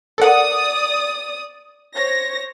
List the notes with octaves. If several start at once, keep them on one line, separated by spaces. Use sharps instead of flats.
A4 A#4 D5 F#5 D#6
C5 C#5 A#6